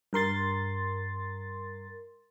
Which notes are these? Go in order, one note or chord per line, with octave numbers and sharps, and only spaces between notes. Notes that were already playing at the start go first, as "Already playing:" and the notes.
G2 A#4 C6 A6